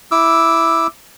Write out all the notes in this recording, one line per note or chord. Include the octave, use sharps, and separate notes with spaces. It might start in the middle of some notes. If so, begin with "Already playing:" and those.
E4 D6 E6